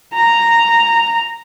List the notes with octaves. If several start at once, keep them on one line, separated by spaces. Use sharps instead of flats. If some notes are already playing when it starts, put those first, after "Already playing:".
A#5